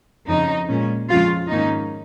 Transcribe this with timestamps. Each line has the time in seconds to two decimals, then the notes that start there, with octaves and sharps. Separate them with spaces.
0.28 F2 C#3 F3 C#4 D#4
0.69 A#2 G#3 C#4
1.09 F2 C#3 F3 G#3 C#4 F4
1.50 G#2 D#3 A#3 C#4 D#4